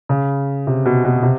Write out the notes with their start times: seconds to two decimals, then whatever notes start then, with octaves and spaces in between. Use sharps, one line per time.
0.09 C#3
0.67 C3
0.86 B2
1.05 B2
1.23 C3